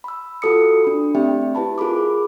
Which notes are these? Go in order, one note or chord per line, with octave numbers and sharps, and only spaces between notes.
B5 E6
F4 F#4 A4 D#6 C#7
D4 B5
A3 C4 G4 D5 E5 G5
E4 G4 B4 A5 B5
F4 G#4 A#4 B5 D6